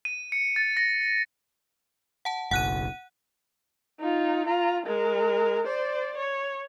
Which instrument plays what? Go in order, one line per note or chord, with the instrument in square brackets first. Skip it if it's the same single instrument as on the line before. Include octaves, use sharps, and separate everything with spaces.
[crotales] D#7
C#7
A6
A#6
[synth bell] F#5 A5
[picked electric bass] F#1 B1 [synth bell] F#5 F#6 D#7
[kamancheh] D#4 F4
F4 A#5
G#3 A#4
C5 D5
C#5